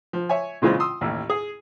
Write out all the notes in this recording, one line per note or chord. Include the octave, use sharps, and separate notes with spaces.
F3
C#5 E5 G#5
A#2 C#3 E3 G#3 C4 F4
C6 D#6 E6
A1 D#2
G#4